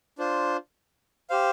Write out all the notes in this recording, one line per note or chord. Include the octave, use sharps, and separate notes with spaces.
D4 F4 C5
G4 C5 F5